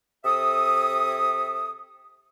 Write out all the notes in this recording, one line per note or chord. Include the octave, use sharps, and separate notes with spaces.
C3 A4 E5 D#6